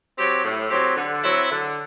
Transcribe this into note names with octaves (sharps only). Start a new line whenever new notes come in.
F#3 C4 G4
A2
F#3 C4 G4
D3
F#3 C4 E4
D3